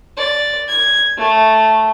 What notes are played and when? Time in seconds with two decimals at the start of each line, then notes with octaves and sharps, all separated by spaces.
0.18 D5
0.68 G#6
1.18 A3